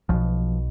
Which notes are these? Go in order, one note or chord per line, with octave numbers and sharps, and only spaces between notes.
B1 B2 F3